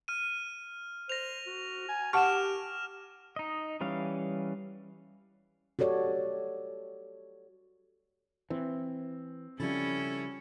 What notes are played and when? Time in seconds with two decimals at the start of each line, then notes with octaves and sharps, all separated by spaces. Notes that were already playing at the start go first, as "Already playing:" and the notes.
0.08 F6 D#7
1.09 C5 A#6 F7
1.47 F#4
1.89 G#5
2.13 G4 F#5 A5 C#6 F6 E7
3.36 D#4 D#5
3.81 E3 G3 C#4 F5
5.79 F#4 G4 A4 C#5 D5
8.50 E3 C4
9.60 C#3 F3 G3 C#4 E4 A4